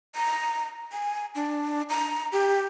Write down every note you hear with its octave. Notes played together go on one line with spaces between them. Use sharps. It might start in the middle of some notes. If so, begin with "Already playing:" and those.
A#5
G#5
D4
A#5
G4